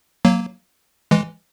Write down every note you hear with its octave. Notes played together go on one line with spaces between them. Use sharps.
F#3 A#3
E3 G#3